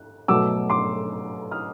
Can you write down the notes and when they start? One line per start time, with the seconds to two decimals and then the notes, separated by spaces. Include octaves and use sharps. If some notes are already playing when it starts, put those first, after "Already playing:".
Already playing: F#6
0.28 B2 F#3 A3 D6 E6
0.70 C6 D6
1.51 D#6 F6